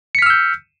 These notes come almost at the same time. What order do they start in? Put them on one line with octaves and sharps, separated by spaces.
C#7 B6 F6 E6 G6